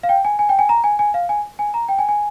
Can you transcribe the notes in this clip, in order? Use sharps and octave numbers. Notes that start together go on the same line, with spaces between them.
F5
G5
G#5
G#5
G5
G#5
A#5
G#5
G#5
F5
G#5
G#5
A#5
G5
G#5
G#5